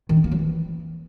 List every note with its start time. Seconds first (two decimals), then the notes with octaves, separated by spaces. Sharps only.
0.09 D#3
0.17 D4
0.24 A#3
0.31 F#3
0.39 E3